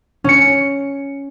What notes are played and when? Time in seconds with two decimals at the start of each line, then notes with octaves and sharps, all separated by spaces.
0.24 C#4 C#7